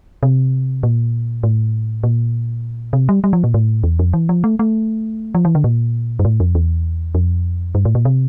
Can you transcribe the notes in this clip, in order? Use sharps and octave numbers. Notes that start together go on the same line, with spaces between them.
C3
A#2
A2
A#2
C3
G3
G3
F3
A#2
A2
E2
F2
E3
F3
A3
A3
F3
E3
D3
A#2
G2
A2
F2
E2
F2
G2
A2
A#2
C3